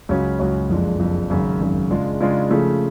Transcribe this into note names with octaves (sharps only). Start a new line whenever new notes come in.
C#2 C#3 F#3 C#4
C#2 C#3 F#3 C#4
F#1 F2 F3 G#3 D4
F#1 F2 F3 G#3 D4
G#1 F#2 C#3
G#1 F#2 C#3
C#3 G#3 D4 F4
C#3 G#3 D4 F4
C#3 F3 A3